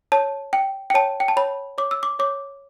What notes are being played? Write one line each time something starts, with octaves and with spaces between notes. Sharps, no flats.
C#5 A5
G5
G5
C#5 A5
G5
A5
C#5 B5
C#5 D6
E6
D6
C#5 D6